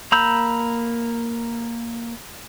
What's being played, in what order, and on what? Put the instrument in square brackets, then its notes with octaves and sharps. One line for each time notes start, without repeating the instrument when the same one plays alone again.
[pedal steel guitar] A#3 A#5 B5 E6 G6